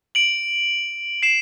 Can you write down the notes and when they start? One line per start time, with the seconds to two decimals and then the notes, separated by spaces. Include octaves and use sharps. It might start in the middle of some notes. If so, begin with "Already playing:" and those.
0.15 D7 F#7
1.23 C7 E7